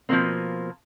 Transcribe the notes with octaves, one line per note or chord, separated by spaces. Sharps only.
B2 F3 F#3 G#3 A#3 C4